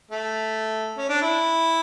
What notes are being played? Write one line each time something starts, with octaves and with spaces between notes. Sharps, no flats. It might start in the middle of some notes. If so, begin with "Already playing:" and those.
A3
C#4
D4
E4